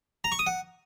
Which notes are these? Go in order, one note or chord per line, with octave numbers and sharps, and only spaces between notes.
A#5
C#6
D#6
F#5